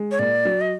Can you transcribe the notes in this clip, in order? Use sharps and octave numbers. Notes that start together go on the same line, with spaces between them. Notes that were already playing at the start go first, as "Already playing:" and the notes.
Already playing: G#3
C#5
A#2 D5
F#3
D#5